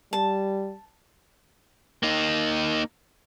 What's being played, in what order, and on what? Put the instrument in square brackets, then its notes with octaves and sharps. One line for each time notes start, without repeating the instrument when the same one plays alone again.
[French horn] G3 [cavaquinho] A5
[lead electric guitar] A#3 D#4